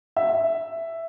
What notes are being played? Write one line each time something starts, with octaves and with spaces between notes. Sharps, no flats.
E5